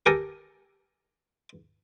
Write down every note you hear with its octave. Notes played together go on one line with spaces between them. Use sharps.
G4 A4 A#4 G#5